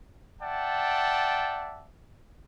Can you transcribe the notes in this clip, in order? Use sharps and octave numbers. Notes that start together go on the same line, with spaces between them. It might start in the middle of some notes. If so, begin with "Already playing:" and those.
D5 E5 F#5 G5 A5